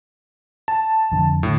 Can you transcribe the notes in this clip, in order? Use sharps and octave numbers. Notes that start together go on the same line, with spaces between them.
A5
F2 D3
A2 D3